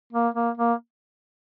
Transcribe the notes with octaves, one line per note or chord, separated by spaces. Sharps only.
A#3
A#3
A#3